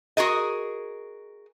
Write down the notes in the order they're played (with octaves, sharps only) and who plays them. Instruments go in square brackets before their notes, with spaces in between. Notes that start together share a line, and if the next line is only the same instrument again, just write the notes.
[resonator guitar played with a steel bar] F#4 G#4 A#4 D#5